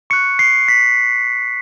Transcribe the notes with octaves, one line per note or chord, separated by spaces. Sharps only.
C#6 F#6 C#7
C7
B6